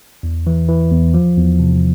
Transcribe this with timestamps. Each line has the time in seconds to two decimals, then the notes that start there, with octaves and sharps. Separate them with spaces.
0.23 E2
0.47 E3
0.69 E3
0.92 E2
1.14 F3
1.37 E2
1.60 C3